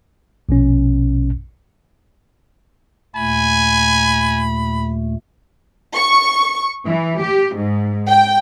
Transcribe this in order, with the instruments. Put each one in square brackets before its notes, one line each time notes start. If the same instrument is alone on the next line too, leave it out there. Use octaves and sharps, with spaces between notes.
[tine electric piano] A#1 B2 C#4
[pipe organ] D#2 A#2 A3 [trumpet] G#5 [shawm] B5
[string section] C#6
E3
G4
G#2
G5